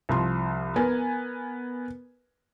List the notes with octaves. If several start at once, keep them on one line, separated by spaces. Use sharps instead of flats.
C2 F3 C6
B3 A#4 B4 G#5